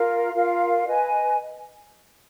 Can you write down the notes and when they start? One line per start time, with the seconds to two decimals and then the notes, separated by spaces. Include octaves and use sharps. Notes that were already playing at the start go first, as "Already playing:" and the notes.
Already playing: F4 A#4 F5
0.32 F4 A#4 F5
0.85 B4 D#5 G#5